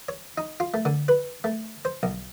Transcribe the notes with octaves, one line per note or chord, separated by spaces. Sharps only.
C#5
D#4
F4
A3
D3
B4
A3
C5
B1